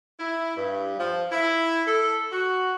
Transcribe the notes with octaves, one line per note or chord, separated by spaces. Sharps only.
E4
G2
F3
E4
A4
F#4